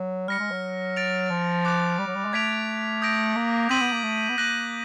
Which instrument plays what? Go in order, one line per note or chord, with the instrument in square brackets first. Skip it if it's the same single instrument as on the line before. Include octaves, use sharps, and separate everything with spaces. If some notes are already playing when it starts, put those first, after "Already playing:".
Already playing: [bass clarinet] F#3
[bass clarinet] G3 [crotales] F6 A#6 C#7
[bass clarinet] G#3
F#3
[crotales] A6 D7 F7
[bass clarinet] F3
[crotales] D6 F#6 A6
[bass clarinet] G3
F#3
G3
G#3
[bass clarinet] A3 [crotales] G#6 B6 D7 F7
[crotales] D#6 G6 A#6 D7
[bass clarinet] A#3
[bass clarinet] C4 [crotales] G6 B6 D#7 F#7
[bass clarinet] B3
A#3
A3
B3
[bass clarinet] A#3 [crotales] F#6 A#6 D#7 F#7